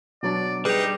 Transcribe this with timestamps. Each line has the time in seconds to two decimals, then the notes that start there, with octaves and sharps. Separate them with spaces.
0.23 B2 F#3 D4 D5
0.65 G3 D#4 G4 G#4 B4